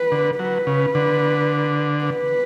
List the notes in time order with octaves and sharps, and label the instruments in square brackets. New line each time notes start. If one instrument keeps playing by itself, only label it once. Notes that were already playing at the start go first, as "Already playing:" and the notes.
Already playing: [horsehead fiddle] B4
[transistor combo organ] D3
[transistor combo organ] F#3 [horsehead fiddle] B4
[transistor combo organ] C#3
D3
[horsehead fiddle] B4